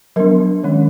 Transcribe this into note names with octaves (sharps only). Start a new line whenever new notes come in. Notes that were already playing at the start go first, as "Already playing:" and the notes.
F#3 B3 D4 A#4
D#3 G#3 C#4